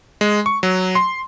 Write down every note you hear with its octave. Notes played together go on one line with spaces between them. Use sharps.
G#3
C#6
F#3
C6